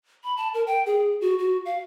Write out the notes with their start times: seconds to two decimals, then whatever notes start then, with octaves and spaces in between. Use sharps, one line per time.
0.24 B5
0.37 A5
0.54 A#4
0.67 G5
0.86 G#4
1.21 F#4
1.38 F#4
1.65 F5